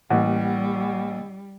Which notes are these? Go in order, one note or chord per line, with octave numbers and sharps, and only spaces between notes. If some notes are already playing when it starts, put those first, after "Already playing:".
A1 G3 A#3 F#5